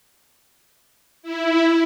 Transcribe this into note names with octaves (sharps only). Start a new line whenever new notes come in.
E4